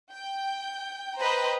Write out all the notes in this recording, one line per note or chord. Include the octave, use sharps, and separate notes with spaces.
G5
B4 C5 D#5 G5 A#5